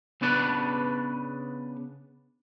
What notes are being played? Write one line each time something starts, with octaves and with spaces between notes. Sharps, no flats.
C#3 B3 D4 B4 D5 A5